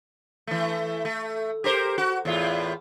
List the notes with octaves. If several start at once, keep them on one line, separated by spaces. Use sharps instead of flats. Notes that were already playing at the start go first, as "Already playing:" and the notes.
E3 A3
A3
G4 A#4 C5
F#4
E2 A2 F4